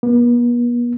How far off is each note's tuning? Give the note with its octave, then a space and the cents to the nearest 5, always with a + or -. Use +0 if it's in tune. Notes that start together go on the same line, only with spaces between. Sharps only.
B3 -45